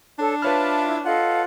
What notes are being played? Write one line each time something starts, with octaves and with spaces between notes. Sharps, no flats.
D4 A4 C#5
F4 B4 C#5 E5 A5 B5 D6 F6
E4
F4 A4 D#5 F5 F#5